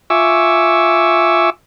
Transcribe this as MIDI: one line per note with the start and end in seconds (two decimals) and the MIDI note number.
0.10 1.50 65
0.10 1.50 76
0.10 1.50 80
0.10 1.50 85
0.10 1.50 86
0.10 1.50 88